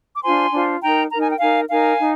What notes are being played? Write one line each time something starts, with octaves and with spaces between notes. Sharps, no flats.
D6
D4 F4 C5 G#5 C6
D4 F4 C5
D#4 A#4 G5 A#5
D#4 A#4 A#5
G#5
G5
D#4 A#4 F5 G#5
D#4 A#4 F5 G#5
D#4